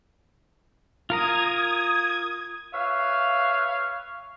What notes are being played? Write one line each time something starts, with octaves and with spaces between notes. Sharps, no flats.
F4 A#4 A#5 D#6 G#6
B4 C#5 E5 F5